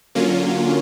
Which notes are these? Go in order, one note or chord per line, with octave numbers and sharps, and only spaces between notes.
D3 F#3 A#3 C#4 F4